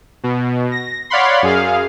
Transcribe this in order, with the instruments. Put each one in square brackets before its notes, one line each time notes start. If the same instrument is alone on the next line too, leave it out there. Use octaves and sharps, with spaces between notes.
[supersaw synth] B2
A#6
C#5 D5 F5 F#5 B5 C6
F#2 G#4 F5